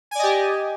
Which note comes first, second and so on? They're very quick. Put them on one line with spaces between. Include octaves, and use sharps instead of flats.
G#5 D5 D#5 G4